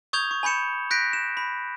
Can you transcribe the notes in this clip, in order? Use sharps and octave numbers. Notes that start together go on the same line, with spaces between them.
C#6 D#6 G6 G#6 F7 G7
C#6
G#5 B5 G6 C#7 E7
F#6 G6 A#6 B6 D7
E7
B5